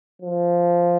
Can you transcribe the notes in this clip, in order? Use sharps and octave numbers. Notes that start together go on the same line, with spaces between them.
F3